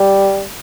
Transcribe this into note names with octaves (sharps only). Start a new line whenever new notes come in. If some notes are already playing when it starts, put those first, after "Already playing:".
Already playing: G3